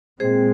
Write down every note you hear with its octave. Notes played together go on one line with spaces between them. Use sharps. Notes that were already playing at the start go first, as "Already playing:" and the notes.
A#2 G#3 C4 G#4 C5